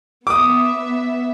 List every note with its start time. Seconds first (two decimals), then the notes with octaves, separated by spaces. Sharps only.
0.27 B3 E5 D6 D#6